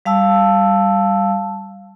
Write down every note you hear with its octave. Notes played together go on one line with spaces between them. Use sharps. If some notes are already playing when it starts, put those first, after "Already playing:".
G3 F5 A5 E6